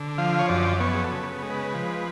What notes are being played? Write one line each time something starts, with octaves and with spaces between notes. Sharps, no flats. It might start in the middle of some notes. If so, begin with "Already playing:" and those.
Already playing: D3
F3 F5
C#5
F#2 D5
B3 C#5
G#4
A4
C#3
G#3
B4
F3